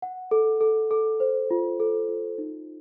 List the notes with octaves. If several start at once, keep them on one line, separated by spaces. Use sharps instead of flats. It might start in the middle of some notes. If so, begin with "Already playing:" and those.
F#5
A4
A4
A4
C5
F4
A4
F4
D#4